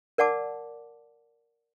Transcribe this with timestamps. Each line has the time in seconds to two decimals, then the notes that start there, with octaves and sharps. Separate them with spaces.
0.18 A#4 D5 F#5 A5 D6